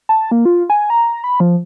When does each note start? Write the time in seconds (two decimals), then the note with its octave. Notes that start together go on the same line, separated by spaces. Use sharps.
0.09 A5
0.31 A#3
0.45 F4
0.70 G#5
0.90 A#5
1.24 B5
1.40 F3